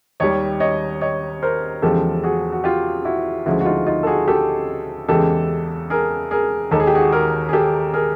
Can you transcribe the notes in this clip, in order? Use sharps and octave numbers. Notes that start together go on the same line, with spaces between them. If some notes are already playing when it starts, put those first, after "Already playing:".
D#2 D#3 G3 C#5 D#5
C#5 D#5
C#5 D#5
A#4 C5
E2 C#3 F3 G#3 G4 A4
F#4 G#4
F#4
F4 G4
E4 F#4
D2 C#3 F3 G#3 E4 F#4
F#4
D#4 F4
D#4 F4
A4
F#4 G#4
G4 A4
E2 C#3 E3 G#3 G4 A4
G#4 A#4
G#4 A#4
D#2 D#3 G#3 A4
G#4
G4
F#4 G#4
G#4 A#4
G#4
G4 A4
G#4 A#4